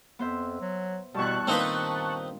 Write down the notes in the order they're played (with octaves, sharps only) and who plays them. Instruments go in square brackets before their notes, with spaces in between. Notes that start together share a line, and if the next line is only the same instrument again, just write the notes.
[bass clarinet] F2 [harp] B3 C5 E5
[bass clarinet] F#3
[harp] E2 G2 [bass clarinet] B2 [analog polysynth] A5 C#6 F#6
[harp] A#2 D4 F5 [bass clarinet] D#3 [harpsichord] C4 D#4 B4